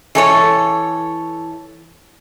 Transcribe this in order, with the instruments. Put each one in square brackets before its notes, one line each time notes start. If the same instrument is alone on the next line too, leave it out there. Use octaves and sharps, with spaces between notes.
[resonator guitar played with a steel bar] E3 A4 C#5